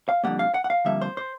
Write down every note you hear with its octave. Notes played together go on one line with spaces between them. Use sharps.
F5
F2 D3 G3 A#3 F#5
F5
F#5
F#5
F5
F2 D3 G3 A#3 E5
C5
C5